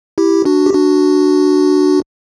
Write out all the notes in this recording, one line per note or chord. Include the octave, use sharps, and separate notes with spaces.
E4 G4
D4 F#4
G4
D4 F#4